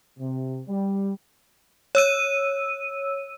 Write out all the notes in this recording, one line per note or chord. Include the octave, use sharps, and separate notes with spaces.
C3
G3
C#5 E6 D#7